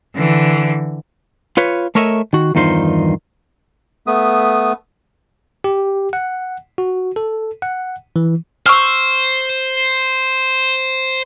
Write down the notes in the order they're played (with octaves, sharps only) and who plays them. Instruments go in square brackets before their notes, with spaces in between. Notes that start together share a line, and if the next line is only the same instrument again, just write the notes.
[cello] D3 E3
[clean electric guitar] F4 B4 C#5
A3 A#4 C#5 D#5 E5
D#3 F#4
E2 G2 D#3 D#4 F4 C5
[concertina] A3 B3 D#6
[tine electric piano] G4
F#5
F#4
A4
F#5
E3
[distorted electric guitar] C5 [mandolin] C#6 E6 F6